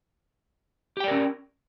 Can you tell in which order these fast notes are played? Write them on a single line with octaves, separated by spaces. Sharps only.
G4 G5 D5 A#4 C#4